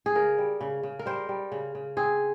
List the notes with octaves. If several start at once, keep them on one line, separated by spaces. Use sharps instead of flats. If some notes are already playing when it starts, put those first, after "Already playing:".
G#4
C#3 A#4
G3
C#3
C#3
A#4
G3 C5
G3
C#3
C#3
C4 G#4